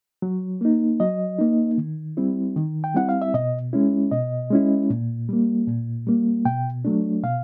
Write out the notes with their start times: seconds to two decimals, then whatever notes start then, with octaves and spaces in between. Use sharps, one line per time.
0.22 F#3
0.61 A#3 D#4
1.00 F#3 D#5
1.39 A#3 D#4
1.78 D#3
2.17 G3 C4 E4
2.56 D#3
2.84 G5
2.94 G3 C4 E4 F#5
3.09 F5
3.22 E5
3.34 B2 D#5
3.73 G#3 C#4 E4
4.11 B2 D#5
4.50 G#3 C#4 E4
4.90 A#2
5.29 G3 A#3
5.67 A#2
6.07 G3 A#3
6.45 B2 G5
6.85 F#3 A3 D4
7.23 B2 F5